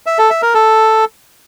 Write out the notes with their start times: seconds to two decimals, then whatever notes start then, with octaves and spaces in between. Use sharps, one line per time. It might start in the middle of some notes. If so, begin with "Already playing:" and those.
0.06 E5
0.18 A4
0.30 E5
0.42 A#4
0.54 A4